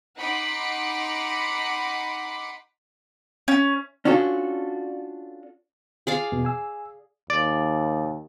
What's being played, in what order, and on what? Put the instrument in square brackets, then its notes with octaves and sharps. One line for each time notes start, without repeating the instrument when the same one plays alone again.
[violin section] D#4 F#5 B5 C6 D6 C#7
[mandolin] C#4
[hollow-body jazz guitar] C#4 D4 F4 F#4 A4
[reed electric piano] F4 [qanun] G#4 D5 F5
[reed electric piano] E2 B2
G#5 E6
[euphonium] D#2 [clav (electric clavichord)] D5